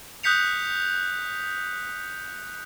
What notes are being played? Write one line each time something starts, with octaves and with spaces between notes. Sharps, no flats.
D#6 F#6 G6 B6 C#7 F7